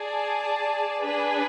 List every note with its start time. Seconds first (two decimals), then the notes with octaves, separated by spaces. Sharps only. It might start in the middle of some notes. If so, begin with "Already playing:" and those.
Already playing: G#4 D5 A5
1.02 D4 G#4 B4